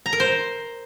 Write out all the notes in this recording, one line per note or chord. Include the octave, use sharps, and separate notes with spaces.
A#5
A#4
C5